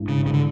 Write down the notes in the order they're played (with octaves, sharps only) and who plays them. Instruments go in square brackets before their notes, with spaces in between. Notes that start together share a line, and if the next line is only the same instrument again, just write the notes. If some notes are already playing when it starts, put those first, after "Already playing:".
Already playing: [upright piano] G#1 G2 E3
[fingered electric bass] C#3
C#3
D3